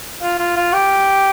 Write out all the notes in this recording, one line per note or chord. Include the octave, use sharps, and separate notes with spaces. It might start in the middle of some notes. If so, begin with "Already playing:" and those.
F4
F4
F4
G4